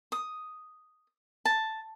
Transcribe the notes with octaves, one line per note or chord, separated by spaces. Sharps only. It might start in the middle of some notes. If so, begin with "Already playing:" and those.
D#6
A5